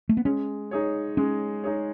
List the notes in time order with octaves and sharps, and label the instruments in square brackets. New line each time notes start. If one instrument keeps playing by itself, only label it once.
[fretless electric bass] A3
B3
[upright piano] G#3 [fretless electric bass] C#4
[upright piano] D#4 G#4 C#5
[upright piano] G#3 [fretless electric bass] C#4
[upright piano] D#4 G#4 C#5